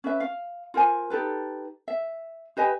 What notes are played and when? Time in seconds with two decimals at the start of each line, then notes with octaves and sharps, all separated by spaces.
0.04 C#4 B4 E5
0.20 F5
0.74 F4 A#4 C5 G#5
1.10 D#4 G4 A4 B4
1.88 E5
2.57 G4 B4 D#5 G#5